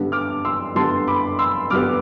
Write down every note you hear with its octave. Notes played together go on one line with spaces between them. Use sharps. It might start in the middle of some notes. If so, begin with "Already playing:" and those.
Already playing: G2 D3 G3 B3
D6 F6
C6 E6
G2 D3 G3 B3 A5 C6
B5 D6
C6 E6
G2 D3 G3 B3 D6 F6